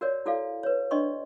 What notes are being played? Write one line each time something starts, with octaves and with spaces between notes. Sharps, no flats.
F#4 A#4 C#5 D5
E4 F#4 A4 D5 F5
B4 C#5
D4 D5 D#5 C6 C#6